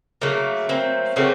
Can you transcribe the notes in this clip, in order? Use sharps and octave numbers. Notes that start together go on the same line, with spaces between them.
C#3 F#3 A3 A#3
A#3 C4
C#3 F#3 A3 A#3 C4